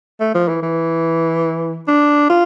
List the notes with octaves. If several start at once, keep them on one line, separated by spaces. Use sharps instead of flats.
A3
F3
E3
E3
D4
F4